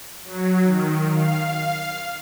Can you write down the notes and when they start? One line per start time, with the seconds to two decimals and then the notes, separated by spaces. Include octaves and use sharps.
0.24 F#3
0.61 D#3
1.11 F5